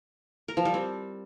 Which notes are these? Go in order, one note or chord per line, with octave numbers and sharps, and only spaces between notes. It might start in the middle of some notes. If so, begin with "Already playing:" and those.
A#4
F3
G3
C4